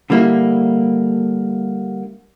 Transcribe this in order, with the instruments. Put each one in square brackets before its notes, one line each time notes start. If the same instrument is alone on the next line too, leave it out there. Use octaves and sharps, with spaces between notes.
[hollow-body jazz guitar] D3 G3 A#3 E4